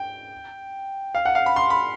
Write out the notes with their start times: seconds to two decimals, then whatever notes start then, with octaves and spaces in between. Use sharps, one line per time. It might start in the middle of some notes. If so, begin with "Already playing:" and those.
Already playing: G5
1.15 F5
1.25 F#5
1.35 F5
1.46 B5
1.56 C6
1.70 B5